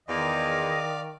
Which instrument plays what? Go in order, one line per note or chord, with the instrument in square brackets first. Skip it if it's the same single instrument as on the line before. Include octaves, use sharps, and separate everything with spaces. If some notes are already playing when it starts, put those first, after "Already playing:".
[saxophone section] E2 [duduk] D#3 [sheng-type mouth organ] D5 F5 [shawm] D#5